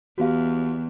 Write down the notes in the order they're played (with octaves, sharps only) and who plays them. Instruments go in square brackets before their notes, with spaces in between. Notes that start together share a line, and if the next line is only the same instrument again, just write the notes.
[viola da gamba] E2 [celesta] F#4 G4 F5